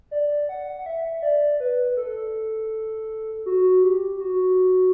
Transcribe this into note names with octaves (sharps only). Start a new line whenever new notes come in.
D5
F#5
F#5
E5
D5
B4
A4
F#4
G4
F#4